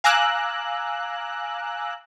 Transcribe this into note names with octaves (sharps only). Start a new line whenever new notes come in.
F5 G#5 A#5 D6 E6 F#6